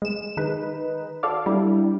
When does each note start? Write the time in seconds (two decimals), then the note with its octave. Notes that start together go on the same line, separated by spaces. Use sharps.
0.02 G#3 E7
0.37 D#3 D#4 G#4 B4
1.23 F#4 A4 D5 F5 D6
1.46 G3 D4 E4